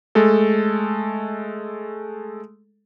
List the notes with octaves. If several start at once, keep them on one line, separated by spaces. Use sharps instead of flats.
G#3 A3 A4